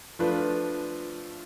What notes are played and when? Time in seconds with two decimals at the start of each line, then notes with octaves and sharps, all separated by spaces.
0.19 F3 A3 D4 F4 B4